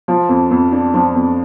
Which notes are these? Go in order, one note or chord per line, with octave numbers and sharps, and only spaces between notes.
F3 F4
F2
F2
D4
F3 D4
F2